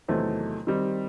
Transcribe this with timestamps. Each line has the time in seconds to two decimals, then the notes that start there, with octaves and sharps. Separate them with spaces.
0.08 E2 C3 D#3 F#3 A3
0.67 D#3 G3 C4